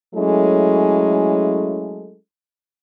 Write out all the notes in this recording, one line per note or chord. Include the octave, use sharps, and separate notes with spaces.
F#3 G#3 A3 C#4 E4 A4